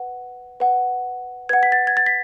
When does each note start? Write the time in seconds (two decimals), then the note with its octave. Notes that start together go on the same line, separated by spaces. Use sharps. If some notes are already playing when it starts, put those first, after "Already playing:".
Already playing: B4 F#5
0.60 B4 F#5
1.49 B4 F#5 G#6
1.63 B6
1.72 A6
1.87 G#6
1.97 A6
2.06 B6